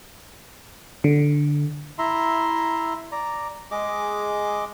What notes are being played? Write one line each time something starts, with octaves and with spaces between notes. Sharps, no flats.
D3
E4 E5 A#5 C6
D5 A#5
G#3 G#4 D#5 D6